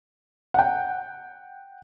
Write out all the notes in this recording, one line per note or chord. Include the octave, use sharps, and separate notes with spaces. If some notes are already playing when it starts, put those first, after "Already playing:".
F#5 G5